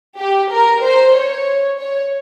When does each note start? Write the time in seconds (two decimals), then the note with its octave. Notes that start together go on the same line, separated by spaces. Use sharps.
0.19 G4
0.52 A#4
0.83 C5
1.16 C#5
1.79 C#5